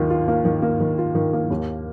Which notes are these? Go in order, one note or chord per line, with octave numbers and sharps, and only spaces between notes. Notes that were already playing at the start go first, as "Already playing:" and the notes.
Already playing: D#2 D#3 F4
F4
A#3
D#3
A#3
D#3
F4
D#3
A#3
D#2